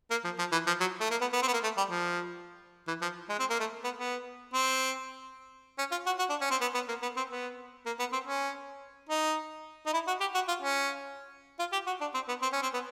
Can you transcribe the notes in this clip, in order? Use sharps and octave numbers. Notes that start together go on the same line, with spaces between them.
A#3
F3
F3
E3
F3
F#3
A3
A#3
B3
B3
C4
B3
A#3
A3
G3
F3
E3
F3
G#3
C4
A#3
A3
B3
B3
C4
C#4
F4
F#4
F#4
D4
C#4
C4
B3
B3
A#3
B3
C4
B3
A#3
B3
C4
C#4
D#4
D#4
E4
F#4
G4
F#4
F4
C#4
F4
G4
F#4
D4
C4
B3
C4
C#4
C4
B3